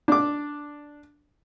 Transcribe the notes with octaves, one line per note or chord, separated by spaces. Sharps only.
D4 D6